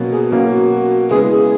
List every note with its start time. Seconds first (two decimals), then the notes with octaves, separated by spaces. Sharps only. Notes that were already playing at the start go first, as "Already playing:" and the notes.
Already playing: B2 F#3 A#3 C#4
0.13 G#4
0.31 B2 F#3 A#3 C#4 F#4
1.10 C#3 G#3 B3 E4 G#4
1.32 G#4